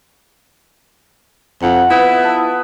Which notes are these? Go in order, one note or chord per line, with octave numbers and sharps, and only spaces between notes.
F2 F4 F#5
B3 E4
A4